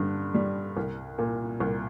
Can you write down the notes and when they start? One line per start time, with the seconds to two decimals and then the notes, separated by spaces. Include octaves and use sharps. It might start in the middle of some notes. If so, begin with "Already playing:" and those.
Already playing: G2 D3
0.34 G3
0.77 C2
1.18 A#2
1.60 C2